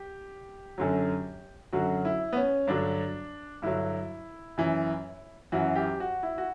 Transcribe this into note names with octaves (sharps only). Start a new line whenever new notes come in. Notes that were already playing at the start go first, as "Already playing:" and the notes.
Already playing: G4
F#2 D3 F#3
F#2 D3 F#3 F#4
E4
B3
C#4
G2 D3 F#3 D4
G2 D3 F#3 E4
F#2 E3
F#2 E3 F#4
G4
F#4
E4
F#4